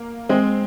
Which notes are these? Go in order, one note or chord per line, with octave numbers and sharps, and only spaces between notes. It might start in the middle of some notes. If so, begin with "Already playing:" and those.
Already playing: A#3
G#3 C4